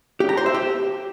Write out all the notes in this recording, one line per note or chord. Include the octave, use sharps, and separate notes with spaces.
G4
A#5
C5
E5
G4